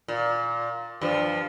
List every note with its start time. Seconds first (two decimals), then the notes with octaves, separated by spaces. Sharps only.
0.08 A#2
1.02 G2 F3